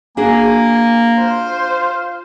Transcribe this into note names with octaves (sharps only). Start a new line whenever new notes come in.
A#3 D4 F#4 G#4 G#5
F4 C5